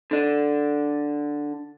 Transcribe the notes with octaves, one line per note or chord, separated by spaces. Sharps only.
D3 D4